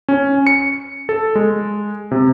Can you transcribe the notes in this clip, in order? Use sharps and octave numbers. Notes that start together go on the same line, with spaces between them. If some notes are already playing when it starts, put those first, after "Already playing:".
C#4
C#7
A4
G#3
C3